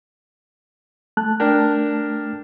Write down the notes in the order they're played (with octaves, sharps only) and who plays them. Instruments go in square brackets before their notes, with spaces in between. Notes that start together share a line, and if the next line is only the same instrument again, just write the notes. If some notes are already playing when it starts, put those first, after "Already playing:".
[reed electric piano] A3 A5 F#6
[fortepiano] D4 A#4 G5